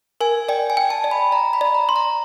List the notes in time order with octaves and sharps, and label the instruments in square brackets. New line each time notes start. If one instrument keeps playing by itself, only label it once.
[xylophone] A#4 [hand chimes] G#5
[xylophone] D5 [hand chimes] G5
[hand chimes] G#5
[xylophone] G5
[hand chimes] A5
[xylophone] D5
[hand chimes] B5
[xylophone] D5 [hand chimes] A#5
[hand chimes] B5
[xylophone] D5
[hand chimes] A#5
[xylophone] C6
[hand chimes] A#5